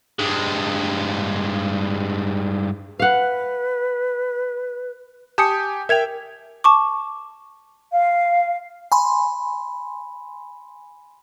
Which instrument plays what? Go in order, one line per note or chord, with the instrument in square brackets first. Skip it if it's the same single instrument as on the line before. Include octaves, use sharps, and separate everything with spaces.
[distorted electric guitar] G2 G#3
[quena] B4 [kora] F5 F#5
[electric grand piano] G4 G#5 G6 [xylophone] A5 D#6 C#7
[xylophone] A#4 G#6 F7 [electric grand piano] E5 G5
[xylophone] A5 C#6 D6
[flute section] F5
[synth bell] G#5 B5 C6